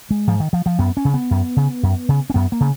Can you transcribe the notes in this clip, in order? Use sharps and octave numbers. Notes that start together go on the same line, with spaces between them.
G#3
G#2 F3
D#3
F3
F3
F#2 B3
C#4
C#3
B3
F#2
C#3
F#2
C#3
C#4
F#2 B3
A#3
C#3